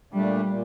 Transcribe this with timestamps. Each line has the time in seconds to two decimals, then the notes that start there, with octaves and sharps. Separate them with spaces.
0.12 A#2 G3 A3 D4
0.48 A#2